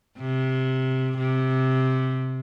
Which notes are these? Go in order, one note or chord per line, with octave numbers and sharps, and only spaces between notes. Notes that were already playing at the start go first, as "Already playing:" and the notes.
C3
C3